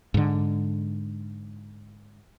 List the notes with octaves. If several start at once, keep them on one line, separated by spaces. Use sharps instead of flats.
G#2 D3